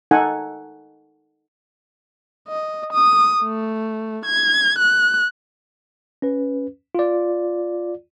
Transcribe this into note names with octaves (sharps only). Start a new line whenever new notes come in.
D#4 A4 F#5 G#5
D#5
D#6
A3
G#6
F#6
C#4 B4
F4 D5